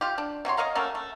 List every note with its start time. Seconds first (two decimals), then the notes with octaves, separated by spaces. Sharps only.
0.01 F4 G4
0.18 D4
0.45 C3 F#4 C#5 C6
0.57 C#5 D#5 F5 A#5
0.75 F#3 A3 A#3 C#4
0.95 A3